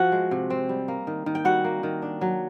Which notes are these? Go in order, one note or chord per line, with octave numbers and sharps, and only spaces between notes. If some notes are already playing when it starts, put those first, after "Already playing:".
Already playing: F3 F#4 F#5
G#3
C3
C4
G3
A#3
D#3
D#3
G5
G3 F#4 F#5
A#3
D#3
D4
F#3